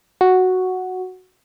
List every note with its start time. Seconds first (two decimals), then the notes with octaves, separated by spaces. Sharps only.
0.21 F#4